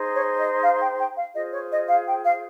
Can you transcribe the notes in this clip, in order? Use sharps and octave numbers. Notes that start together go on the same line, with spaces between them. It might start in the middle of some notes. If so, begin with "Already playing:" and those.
Already playing: D#4 G#4 C5
C#5
D#5
F5
G5
G5
F5
F4 G#4 C5 D#5
C#5
D#5
F5
G5
F5